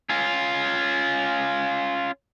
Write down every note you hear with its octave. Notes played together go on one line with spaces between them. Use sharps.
C#4 F4